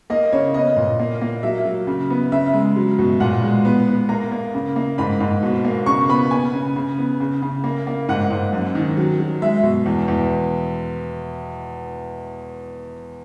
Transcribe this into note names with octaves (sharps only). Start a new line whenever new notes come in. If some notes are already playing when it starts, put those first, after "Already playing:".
A#3 D#5
C#3 C#5
B3 D#5
A#2
A#3
A#3
F#3 E5
F#3
C#3
B3
C#3 E5
G#3
F#3
B2
A#2 F#5
G#3
B3
B3
A#3 A#5
A#3
C#3
A#3
G#2 B5
G#2
B2
A#3
C#3 C#6
B3 B5
B3 G#5
C#3
C#3
B3
C#3
C#3
A#3
A#3
G#2 F#5
G#2
F#2
D#3
F#3
F#3
G#3 E5
B2
E2
E2